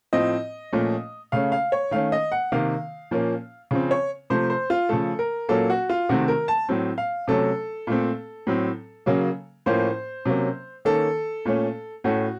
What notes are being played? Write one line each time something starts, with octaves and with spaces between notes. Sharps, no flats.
A2 F3 C4 D#5
A#2 F3 A3 C#4
C#3 A3 C#4 F5
F5
C#5
D#3 A3 C#4 F5
D#5
F#5
C3 D#3 A#3 F5
A#2 F3 A#3 C#4
C#3 F3 C4
C#5
C3 F3 A3 C5
C5
F4
C#3 F3 A3 A4
A#4
A#2 F#3 A#3 C#4 A4
F#4
F4
C3 D#3 A3 C4 F#4
A#4
A5
A2 F#3 C4
F5
C3 F#3 A3 C#4 A4
A#2 A3 C4
A2 F#3 C4
C#3 F#3 A#3 C#4
A2 F3 A#3 C#4 C5
C3 F#3 A#3 C#4
D#3 A#3 C#4 A4
A#2 A3 C#4
A2 A3 C#4 F#4